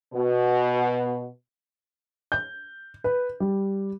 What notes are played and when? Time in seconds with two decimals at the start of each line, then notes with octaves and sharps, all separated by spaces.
0.13 B2
2.32 G6
3.04 B4
3.40 G3